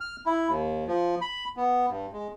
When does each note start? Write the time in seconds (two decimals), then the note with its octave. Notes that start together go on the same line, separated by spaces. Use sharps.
0.01 F6
0.26 E4
0.48 D#2
0.87 F3
1.21 B5
1.57 B3
1.89 G2
2.13 G#3